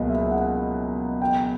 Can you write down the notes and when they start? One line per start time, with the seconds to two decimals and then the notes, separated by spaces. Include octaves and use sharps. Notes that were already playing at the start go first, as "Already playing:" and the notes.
Already playing: C#2 B2 F#3 A#3 D#5
0.09 E5
0.31 F#5
1.22 G5